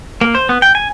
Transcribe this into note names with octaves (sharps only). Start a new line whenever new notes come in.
A#3
C5
B3
G5
G#5